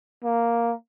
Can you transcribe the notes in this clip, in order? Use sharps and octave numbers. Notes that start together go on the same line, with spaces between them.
A#3